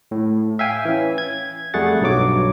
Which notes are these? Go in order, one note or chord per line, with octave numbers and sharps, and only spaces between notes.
A2
E5 F5 G5 G#5
E3 C#4
G#6
F2 G3 A3 G#4 F#5 A6
B1 G2 F#3 C#5 D6